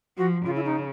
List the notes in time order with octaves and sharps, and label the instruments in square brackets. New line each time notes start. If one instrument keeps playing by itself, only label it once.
[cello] F3 [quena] F#4
[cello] C#3 [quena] F4
[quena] E4
D#4